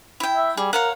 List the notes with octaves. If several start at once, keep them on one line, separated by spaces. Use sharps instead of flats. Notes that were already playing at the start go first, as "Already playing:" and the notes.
E4 G5
E5
G3 G#4
A#4 C#5 F5 F#5